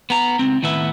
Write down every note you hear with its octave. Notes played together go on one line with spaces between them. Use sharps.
B3 A#5
C#2 C4
A2 D#3 B3 B4 E5